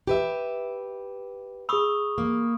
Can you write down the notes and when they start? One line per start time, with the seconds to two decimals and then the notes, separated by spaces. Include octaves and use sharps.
0.07 G4 B4 E5
1.69 G#4 B5 C#6 D#6 E6
2.18 A#3